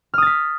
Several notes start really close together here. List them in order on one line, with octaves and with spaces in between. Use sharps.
F6 D#6 A6 B6